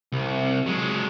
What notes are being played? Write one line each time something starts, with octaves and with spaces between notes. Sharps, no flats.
C2
F#3 G#3